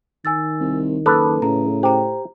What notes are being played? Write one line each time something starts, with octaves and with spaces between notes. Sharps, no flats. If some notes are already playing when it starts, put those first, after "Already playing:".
D#3 G#5 E6 A6
C2
F#1 A4 B4 D6 D#6 F#6
A2 C#3 A#5
G4 C5 A#5